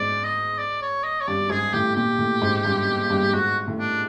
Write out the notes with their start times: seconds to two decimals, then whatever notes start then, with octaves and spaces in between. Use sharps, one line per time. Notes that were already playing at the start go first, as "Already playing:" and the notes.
Already playing: G#2 D5
0.24 D#5
0.58 D5
0.82 C#5
1.04 D#5
1.21 C#5
1.28 G2 D5
1.50 G#2 G#4
1.73 A2 G4
1.96 A#2 G4
2.19 A2
2.42 G#2
2.65 G2
3.10 G2
3.33 G#2 F#4
3.68 A2
3.79 D4